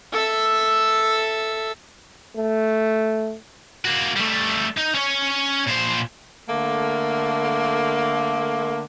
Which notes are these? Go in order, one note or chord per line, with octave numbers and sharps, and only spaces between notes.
A4 E5
A3
A#3 F#4
G3 A3
D#4
C#4 C#5
A#2 C5
D3 A3 A#3